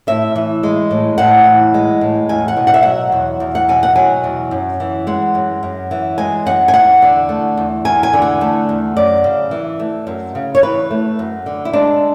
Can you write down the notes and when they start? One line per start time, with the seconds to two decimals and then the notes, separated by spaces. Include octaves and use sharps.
0.07 A2 E5
0.36 E3
0.63 G#3
0.91 A2
1.18 A2 F#5
1.46 E3
1.74 G#3
2.01 A2
2.29 E2 G#5
2.48 F#5
2.57 B2
2.67 F#5
2.74 E5
2.83 F#3 F#5
3.12 E2
3.40 E2
3.55 F#5
3.69 B2 G#5
3.83 F#5
3.96 F#3 G#5
4.24 E2
4.51 F#2
4.80 E3
5.07 G#3 F#5
5.35 F#2
5.63 F#2
5.91 E3
6.18 G#3 G#5
6.46 F#2 F#5
6.68 G#5
6.74 E2 F#5
7.02 D3
7.29 A3
7.57 E2
7.85 E2 G#5
8.03 G#5
8.13 D3
8.22 F#5
8.41 A3
8.69 E2
8.96 F#2 D5
9.24 C#3
9.51 E3
9.79 A3
10.07 F#2
10.35 C#3
10.55 C#5
10.63 E3 B4
10.91 A3
11.19 F#2
11.46 D3
11.65 E4
11.73 G#3 D4